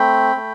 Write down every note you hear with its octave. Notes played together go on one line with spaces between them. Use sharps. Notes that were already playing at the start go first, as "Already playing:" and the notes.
Already playing: A3 C4 G5 B5
A3